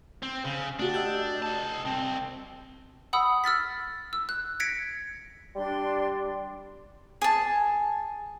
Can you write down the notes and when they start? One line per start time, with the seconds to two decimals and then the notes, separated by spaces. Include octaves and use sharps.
0.23 C4
0.45 C#3
0.79 A3 D4 F#4 G4
0.94 D#5 E6 G6
1.42 G#4 A5
1.85 C2 C4
3.13 F#5 B5 D#6 E6
3.44 E6 F6 A6 B6
4.13 E6
4.29 F#6
4.60 G#6 A#6 B6 C#7 D7
5.56 G3 D4 C6
7.22 G#4 A5